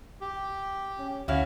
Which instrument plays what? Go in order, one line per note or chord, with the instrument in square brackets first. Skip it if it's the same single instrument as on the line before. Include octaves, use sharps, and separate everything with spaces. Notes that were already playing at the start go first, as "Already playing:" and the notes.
[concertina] G4
[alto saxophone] C#4
[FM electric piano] D2 [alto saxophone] C#4 [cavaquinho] E4 F#4 F5